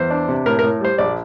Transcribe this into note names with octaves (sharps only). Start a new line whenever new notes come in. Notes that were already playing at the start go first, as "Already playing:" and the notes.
Already playing: E2 C5
D4
C3
A2 A#4
A2 A#4
G3 C5
A#1 D5